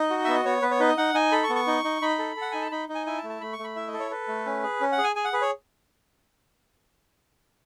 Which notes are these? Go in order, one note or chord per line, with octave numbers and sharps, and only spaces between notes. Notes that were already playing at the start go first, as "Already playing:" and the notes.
Already playing: D#4 D#5
F#4
B3 E5
D#5
B3 C#5
B3 B4
C#5
D#4 B4
D#5
D#4 F#5
D#4 G#5
A4 B5
C#6
B3
C#6
D#4
D#4
D#4 B5
A4
A4
F#5
D#4 G#5
A5
D#4 B5
D#4
G#5
E4 G#5
A5
A3
A5
A3 B5
C#6
A3
B5
E4 E5
D#5
A4
C#5
A4 B4
A3
C#4
G#4
C#4
F#5
G#4
G#5
G#4 G#5
F#5
G#4 B4
C#5